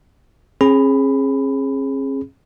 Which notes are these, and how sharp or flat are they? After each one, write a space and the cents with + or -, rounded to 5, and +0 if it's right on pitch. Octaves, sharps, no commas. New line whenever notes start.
C#4 -45 G#4 +0 B5 +10